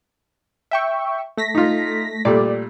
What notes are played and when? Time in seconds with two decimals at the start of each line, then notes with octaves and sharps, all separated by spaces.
0.71 E5 G5 C#6
1.37 A3 A#6 B6
1.55 D#4 F4
2.25 A#2 G3 A3 D5